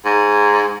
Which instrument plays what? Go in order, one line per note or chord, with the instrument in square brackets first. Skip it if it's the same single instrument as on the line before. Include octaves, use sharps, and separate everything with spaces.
[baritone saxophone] G#2